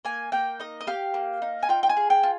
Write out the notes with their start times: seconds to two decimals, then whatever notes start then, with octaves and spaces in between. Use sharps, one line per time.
0.05 A#3 G#5
0.32 A#3 G5
0.60 D#4 D#5
0.81 D#5
0.87 G4 F5
1.14 A#3
1.42 D#4
1.63 G#5
1.69 F4 G5
1.83 G5
1.89 G#5
1.97 G#4
2.10 G5
2.23 F4